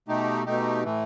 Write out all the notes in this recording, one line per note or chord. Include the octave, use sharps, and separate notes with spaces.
B2 A3 D#4 G4
B2 A3 D#4 G4
A2 E3 A3